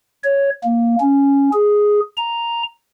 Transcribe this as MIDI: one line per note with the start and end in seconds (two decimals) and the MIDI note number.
0.23 0.50 73
0.64 0.96 58
1.01 1.50 61
1.53 2.00 68
2.17 2.63 82